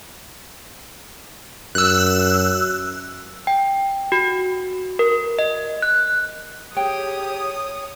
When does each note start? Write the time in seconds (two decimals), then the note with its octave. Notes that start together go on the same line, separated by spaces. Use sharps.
1.75 F#2 E6 F#6
3.47 G5
4.12 F#4
4.99 A#4
5.39 D#5
5.82 F#6
6.77 G4 G#4 C#5 G5 D#6